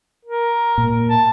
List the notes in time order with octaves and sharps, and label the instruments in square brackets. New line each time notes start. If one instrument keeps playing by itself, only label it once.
[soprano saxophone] A#4
[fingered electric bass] A#2
[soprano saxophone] A5